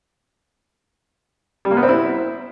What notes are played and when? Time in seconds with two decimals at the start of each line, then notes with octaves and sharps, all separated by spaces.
1.65 G3
1.71 A#3
1.77 B3
1.83 C4
1.89 E4